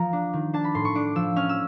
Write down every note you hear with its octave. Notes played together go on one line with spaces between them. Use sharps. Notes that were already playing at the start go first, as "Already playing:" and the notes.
Already playing: F3 A#5
D4
D#3
D4 A5
B5
A2 C6
C#6
D4 D6
F3 E6
C#4 F6
E6